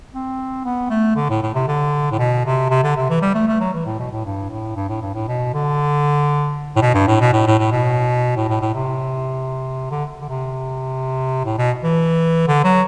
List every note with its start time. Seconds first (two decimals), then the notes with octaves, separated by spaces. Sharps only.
0.13 C4
0.66 B3
0.90 A3
1.16 D3
1.30 A2
1.43 A2
1.54 C3
1.68 D3
2.12 A2
2.19 B2
2.45 C3
2.70 C3
2.83 D3
2.97 C3
3.10 E3
3.22 G3
3.35 A3
3.48 A3
3.60 F#3
3.74 E3
3.86 A2
3.99 B2
4.12 A2
4.25 G2
4.50 A2
4.76 G2
4.89 A2
5.02 G2
5.14 A2
5.28 B2
5.54 D3
6.76 A2
6.82 B2
6.95 G2
7.07 A2
7.21 B2
7.33 A2
7.47 A2
7.59 A2
7.72 B2
8.36 A2
8.49 A2
8.61 A2
8.75 C3
9.91 D3
10.22 D3
10.29 C3
11.45 A2
11.58 B2
11.84 E3
12.48 D3
12.64 F#3